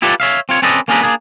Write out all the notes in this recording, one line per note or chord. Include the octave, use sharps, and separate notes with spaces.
E4 F4 G4 A4 B4 D5
C#5 E5 F5
C4 F4 C#5
C4 C#4 A4 B4 D5 D#5
A#3 C#4 D4 G#4 A#4 B4
A#3 D4 G#4